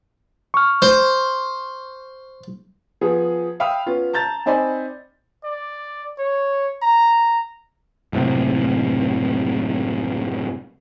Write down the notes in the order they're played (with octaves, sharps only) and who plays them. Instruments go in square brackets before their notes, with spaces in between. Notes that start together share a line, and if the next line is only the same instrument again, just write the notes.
[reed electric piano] C#6 F6
[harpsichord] C5
[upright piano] F3 B3 G#4
E5 F5 G5 B5 D#6 F6
B3 C#4 F4
A5 A#5 G6 A6
C4 D#4 C5 D5 G#5 B5
[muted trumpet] D5
C#5
A#5
[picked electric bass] F#1 A2 C3